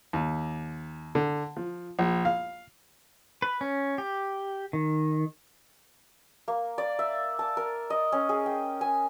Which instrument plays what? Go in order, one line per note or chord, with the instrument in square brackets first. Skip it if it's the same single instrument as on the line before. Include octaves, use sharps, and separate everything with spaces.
[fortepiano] D#2
D3
F3
A#1
F5
[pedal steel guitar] B4
C#4
G4
D#3
[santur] A#3
D5
E5
A5
A#4
D#5
C#4
G#4
G5
G#5